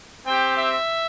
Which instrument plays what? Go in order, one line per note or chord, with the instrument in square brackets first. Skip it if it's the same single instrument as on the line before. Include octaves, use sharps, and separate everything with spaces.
[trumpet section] C4 G4 G5
E5